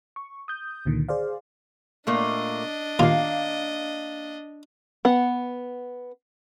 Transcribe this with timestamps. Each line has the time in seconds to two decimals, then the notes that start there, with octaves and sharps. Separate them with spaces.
0.16 C#6
0.48 D#6 G6
0.86 C#2 A#2 D3 D#3
1.09 G#4 C5 D5 F5
2.07 A#2 A3 A#3 D4 D#5
2.99 D#2 A#3 F4 F5
5.05 B3 F#5